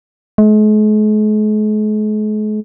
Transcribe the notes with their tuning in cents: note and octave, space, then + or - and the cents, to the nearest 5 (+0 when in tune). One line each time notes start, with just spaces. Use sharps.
G#3 +45